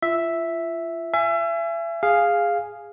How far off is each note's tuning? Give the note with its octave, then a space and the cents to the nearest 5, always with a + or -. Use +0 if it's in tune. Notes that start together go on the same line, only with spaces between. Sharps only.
F4 -30 E5 +0
E5 +35 G#5 +0
G#4 -10 F5 +0 G#5 +0